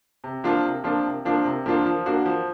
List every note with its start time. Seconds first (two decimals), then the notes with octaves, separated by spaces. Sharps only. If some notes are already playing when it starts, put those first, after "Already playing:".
0.24 C3
0.44 F3 A#3 D4 F4
0.64 C3
0.84 F3 A#3 D4 F4
1.05 C3
1.25 F3 A#3 D4 F4
1.45 C3
1.66 F3 A#3 D4 F4
1.86 F3
2.06 A#3 D4 F#4
2.25 F3